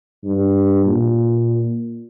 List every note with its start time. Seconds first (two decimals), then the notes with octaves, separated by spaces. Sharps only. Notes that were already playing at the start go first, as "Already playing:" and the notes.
0.24 G2
0.86 A#2